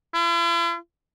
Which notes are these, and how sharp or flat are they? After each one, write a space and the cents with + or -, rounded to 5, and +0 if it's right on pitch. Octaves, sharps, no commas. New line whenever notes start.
E4 +45